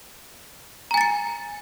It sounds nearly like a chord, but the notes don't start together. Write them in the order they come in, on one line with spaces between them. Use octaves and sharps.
A#5 G#5 A6 C#7